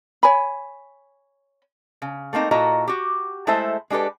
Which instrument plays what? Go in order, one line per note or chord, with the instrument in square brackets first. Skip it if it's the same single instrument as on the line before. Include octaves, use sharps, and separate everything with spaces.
[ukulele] C#5 G#5 B5
[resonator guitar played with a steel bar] C#3
A3 A#3 C4 D#4
A#2 E4 F#4 A4 D#5 A#5
F#4 G4
G#3 A3 E4 A4 C5 E5
G#3 D4 G4 A4 B4